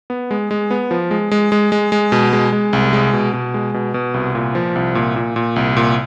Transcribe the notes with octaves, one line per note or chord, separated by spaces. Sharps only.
B3
G#3
G#3
B3
F3
G#3
G#3
G#3
G#3
G#3
B2
G#3
G#3
C2
G#3
B2
B2
G#3
B2
B2
C2
A#2
F3
C2
A#2
A#2
A#2
C2
A#2